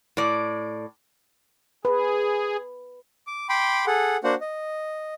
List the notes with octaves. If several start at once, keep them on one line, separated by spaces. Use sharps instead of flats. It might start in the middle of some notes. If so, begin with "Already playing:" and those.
A2 D5
G#4 B4
D6
G5 B5 C6 D6
G#4 A4 F#5
A#3 D4 F#4 C5 F#5
D#5